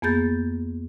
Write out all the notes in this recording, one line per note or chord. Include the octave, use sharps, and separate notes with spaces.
F2 A#3 B3 G#4 G6 A6